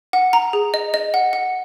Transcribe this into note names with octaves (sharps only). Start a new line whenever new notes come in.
F#5
A#5
G#4
D#5
D#5
F#5
F#5